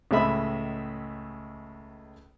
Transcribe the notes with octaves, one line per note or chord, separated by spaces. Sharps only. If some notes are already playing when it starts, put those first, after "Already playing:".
C#2 A2 G#3 D#5 E5 B5